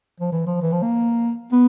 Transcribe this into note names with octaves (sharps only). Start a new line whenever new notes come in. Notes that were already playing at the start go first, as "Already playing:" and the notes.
F3
E3
F3
E3
F3
A#3
B3